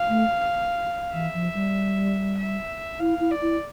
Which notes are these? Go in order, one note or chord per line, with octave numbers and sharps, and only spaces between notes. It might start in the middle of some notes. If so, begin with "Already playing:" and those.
Already playing: F5
A3
E3 E5
F3
G3
E5
E4 F5
E4
D5
E4